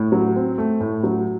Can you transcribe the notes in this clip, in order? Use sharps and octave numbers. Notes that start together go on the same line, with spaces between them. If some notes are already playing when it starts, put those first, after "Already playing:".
Already playing: A2
F#3
C4
A3
A2
F#3